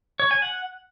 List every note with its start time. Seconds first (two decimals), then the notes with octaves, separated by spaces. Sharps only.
0.20 C#5
0.31 G#5
0.42 F#5